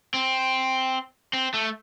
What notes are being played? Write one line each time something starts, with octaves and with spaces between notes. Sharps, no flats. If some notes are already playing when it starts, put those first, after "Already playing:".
C4
C4
A3